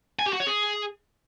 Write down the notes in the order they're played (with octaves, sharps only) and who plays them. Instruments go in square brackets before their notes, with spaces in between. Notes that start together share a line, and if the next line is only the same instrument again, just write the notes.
[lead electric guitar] G#5
G4
F#4
C#5
G#4